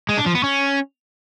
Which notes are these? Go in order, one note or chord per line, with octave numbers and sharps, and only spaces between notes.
G#3
D4
F3
B3
C#4